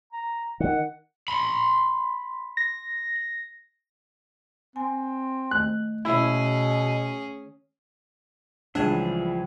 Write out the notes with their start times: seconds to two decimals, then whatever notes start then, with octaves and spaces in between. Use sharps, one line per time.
0.13 A#5
0.60 D#3 F#5
1.28 B5 C6
2.57 A#6
4.76 C4 G#5
5.51 D#3 A3 F#6
6.05 B2 C#4 E4 G#4
8.75 C#2 E3 F3 G3 D4 G#4 E5